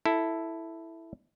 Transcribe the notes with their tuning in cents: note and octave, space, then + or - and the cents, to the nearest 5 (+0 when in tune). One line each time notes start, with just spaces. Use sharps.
E4 +0 A4 +0